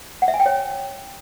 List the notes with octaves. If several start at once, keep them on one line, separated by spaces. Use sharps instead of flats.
F#5
E5
G#5
G5
C#5